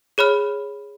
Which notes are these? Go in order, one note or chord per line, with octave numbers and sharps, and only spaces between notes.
G#4 C#5 B5 F6